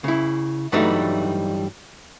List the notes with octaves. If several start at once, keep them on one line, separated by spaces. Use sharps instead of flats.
C#3 E4
G2 E3 F#3 G3 A3 D#4